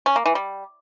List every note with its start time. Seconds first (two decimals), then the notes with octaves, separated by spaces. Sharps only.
0.06 C#4
0.16 A#3
0.26 E3
0.35 G3